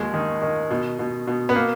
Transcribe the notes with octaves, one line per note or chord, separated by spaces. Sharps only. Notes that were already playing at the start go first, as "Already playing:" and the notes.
Already playing: D#2 F3 G#3
D#3
D#3
B2
B2
B2
B3
A#3